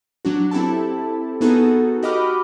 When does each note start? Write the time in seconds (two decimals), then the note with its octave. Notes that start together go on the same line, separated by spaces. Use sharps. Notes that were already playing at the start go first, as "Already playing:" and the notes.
0.25 F#3 D4 F#4
0.51 C4 E4 G4 A4 A5
1.41 B3 D#4 F#4 G#4 A4
2.03 F#4 G4 D#5 B5 D6 F6